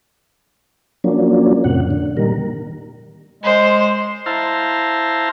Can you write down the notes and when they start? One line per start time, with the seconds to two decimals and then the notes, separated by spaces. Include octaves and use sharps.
1.04 F3 F#3 A#3 C#4 D4
1.64 F2 A2 C3 F#5
1.91 D3
2.17 A#2 D#3 G3 A#4
3.43 G#3 C5
4.26 E4 C5 F5 A5 A#5 C6